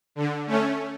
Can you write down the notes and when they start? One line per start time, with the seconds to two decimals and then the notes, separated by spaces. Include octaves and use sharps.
0.15 D3
0.47 A3 C#4